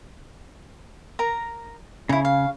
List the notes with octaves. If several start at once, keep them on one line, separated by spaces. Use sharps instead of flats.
A#4 A#5
C#3 D#4 E4
F5